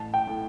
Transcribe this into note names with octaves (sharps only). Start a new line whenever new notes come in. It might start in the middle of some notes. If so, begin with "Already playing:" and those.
Already playing: A1 A5
G5
A2